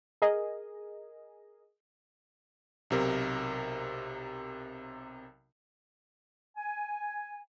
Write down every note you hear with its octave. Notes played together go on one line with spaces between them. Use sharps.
G#4 A#4 D#5
B1 C3 A#4
G#5